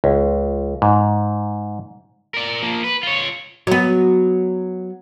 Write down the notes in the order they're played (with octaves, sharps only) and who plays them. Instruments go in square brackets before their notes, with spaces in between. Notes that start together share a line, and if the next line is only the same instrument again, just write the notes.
[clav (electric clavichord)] C#2
G#2
[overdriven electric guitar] A#4 D5
F3 A#3
B4
F4 C#5
[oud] F#3 B3